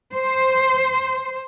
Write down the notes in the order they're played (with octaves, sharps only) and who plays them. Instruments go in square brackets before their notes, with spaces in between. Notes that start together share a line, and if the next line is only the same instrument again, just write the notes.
[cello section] C5